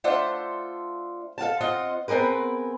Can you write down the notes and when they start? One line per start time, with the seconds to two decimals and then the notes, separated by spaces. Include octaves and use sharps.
0.04 A3 D4 F4 C5 E5 F#5
1.38 A4 F5 F#5 A5
1.60 C4 F4 D#5 F#5
2.08 B3 C4 G#4 A#4 B4